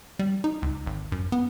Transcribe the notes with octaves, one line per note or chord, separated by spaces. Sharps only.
G3
D#4
C#2
G#1
F#2
B3